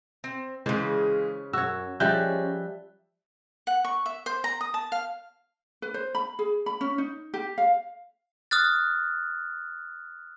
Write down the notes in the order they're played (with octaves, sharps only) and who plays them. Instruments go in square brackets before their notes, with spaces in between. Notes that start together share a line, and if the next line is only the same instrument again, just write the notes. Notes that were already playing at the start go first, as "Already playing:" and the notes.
[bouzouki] C4
[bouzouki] C#3 A5 [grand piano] E3 G#3 [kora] C5
[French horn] F#2 [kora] F#4 C#5 [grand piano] E6
[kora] F3 G3 [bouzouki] G#3 [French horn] C#4 [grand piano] E5 F#6 G6
[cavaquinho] F#5
C#6
E5
C5
A#5
D#6
A5
F5
[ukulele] B4
C5
B5
G#4
B5
C#4
D#4
G4
F5
[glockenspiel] D#6 F6 F#6 A6